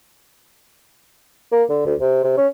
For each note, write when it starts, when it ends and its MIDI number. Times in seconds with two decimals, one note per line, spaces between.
1.52 1.63 58
1.69 1.85 50
1.86 1.95 38
2.00 2.21 48
2.24 2.34 48
2.37 2.47 61